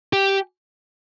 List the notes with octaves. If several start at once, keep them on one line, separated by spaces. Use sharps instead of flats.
G4